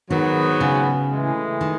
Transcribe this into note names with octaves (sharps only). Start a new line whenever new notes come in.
G#2 D#3 F#3 B3
C#3
A2 E3 G#3
D#3